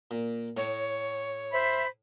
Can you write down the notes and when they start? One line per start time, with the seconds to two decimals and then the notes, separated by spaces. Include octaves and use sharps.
0.11 A#2
0.57 A2 C#5
1.52 C5 E5 B5